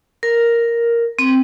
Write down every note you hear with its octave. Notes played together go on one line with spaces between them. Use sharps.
A#4
C4